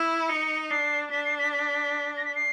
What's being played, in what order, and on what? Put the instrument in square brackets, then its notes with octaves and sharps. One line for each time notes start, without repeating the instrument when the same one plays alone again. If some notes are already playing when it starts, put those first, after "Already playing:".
Already playing: [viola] E4
[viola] D#4 [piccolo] C#7
[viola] D4 [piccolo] C7
[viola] D4 [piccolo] B6
[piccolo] C7
B6
B6
A#6
B6
C7